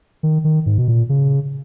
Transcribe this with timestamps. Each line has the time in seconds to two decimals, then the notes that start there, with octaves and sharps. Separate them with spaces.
0.23 D#3
0.44 D#3
0.66 G#2
0.78 B2
0.88 A#2
1.09 C#3